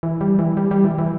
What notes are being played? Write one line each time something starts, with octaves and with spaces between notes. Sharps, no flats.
E3
G3
E3
G3
G3
E3
E3